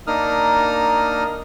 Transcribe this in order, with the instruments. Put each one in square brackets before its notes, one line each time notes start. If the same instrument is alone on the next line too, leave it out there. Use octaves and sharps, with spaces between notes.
[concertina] A#3 D4 D#4 D#6 F6